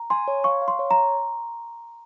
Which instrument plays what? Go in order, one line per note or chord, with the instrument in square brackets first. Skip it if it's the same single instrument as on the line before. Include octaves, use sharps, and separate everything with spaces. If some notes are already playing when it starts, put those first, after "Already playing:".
Already playing: [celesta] A#5
[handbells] G#5 [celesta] C6
[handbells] C#5
[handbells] F5 [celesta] C#6
[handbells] F5
[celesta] C6
[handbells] C#5
[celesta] A#5